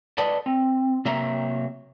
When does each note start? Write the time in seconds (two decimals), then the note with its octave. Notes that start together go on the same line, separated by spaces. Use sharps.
0.18 A4 B4 D5 D#5 A5
0.46 C4
1.05 C3 F#3 A#3 E5 A#5